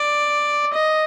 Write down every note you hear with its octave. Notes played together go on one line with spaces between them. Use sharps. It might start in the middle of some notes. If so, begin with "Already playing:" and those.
Already playing: D5
D#5